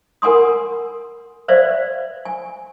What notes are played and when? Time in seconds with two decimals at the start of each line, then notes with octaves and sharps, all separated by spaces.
0.22 A#4 F#5 G#5 C6 D#6
1.48 B4 C5 D5 E5 F5
2.25 G#5